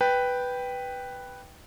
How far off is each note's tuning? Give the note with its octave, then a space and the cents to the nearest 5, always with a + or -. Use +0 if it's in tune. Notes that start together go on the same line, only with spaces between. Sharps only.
B4 +0 G5 +0